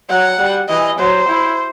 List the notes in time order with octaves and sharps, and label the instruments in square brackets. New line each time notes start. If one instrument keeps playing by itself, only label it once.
[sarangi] F#3 [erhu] F#5
[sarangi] G3
[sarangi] E3 [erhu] D#5
[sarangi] F#3 [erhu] C5
[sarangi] E4